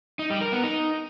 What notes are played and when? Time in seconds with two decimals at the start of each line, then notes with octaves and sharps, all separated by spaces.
0.19 D#4
0.30 G3
0.41 A#4
0.52 B3
0.63 D#4